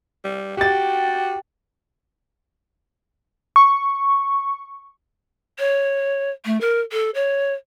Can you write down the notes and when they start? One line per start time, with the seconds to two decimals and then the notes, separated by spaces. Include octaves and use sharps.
0.25 G3
0.57 F#4 G4 G5 A6
3.56 C#6
5.59 C#5
6.45 A3
6.61 A#4
6.92 A4
7.15 C#5